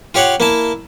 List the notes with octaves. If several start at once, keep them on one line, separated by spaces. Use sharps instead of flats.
F4 G4 C#5 F5 F#5
A#3 E4 A5